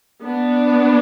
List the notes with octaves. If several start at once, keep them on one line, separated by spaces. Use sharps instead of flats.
B3 D4